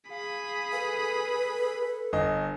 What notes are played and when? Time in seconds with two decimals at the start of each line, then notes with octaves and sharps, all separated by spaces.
0.10 G#4 F5 B5
0.73 A4 B4
2.13 G1 D#5